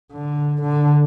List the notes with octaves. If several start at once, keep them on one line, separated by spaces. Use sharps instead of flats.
D3
D3